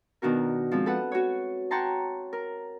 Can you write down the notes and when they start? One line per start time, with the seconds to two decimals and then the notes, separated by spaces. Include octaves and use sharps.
0.22 B2 D#3 D4 F#4 A#4
0.72 F3 G#3 C4
0.86 A4 B4 F#5
1.12 F#4 C#5
1.71 C#5 F#5 G5 A5 A#5 C6
2.33 A#4